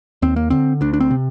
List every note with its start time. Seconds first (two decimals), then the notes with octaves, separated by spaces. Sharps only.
0.22 D#2 C4
0.36 A#3
0.50 D3 C4
0.81 D2 D4
0.93 D4
1.00 C4
1.11 C3